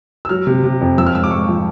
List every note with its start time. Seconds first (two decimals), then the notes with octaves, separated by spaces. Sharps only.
0.25 E6
0.29 F#3 F6
0.47 C3
0.63 C3
0.81 F2
0.98 F3 E6
1.06 F6
1.15 G#2 E6
1.24 D6
1.31 G#2 C#6
1.48 F3